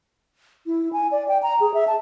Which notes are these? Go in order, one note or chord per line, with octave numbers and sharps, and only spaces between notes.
E4
G#5
D5
G5
A#5
G#4
E5
A5